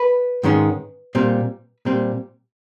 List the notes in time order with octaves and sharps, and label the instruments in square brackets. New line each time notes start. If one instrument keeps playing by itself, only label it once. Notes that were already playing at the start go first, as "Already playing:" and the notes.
Already playing: [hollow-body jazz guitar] B4
G#2 D#3 G#3 C#4
A#2 G3 C4
A#2 G3 C4